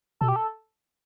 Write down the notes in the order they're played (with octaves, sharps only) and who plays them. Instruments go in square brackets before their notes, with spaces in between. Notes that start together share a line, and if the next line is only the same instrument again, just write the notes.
[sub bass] B2 [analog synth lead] A4
[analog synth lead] G4
A4